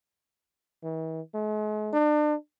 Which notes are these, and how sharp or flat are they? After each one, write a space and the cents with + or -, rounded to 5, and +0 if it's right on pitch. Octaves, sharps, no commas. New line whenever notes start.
E3 -45
G#3 +45
D4 +35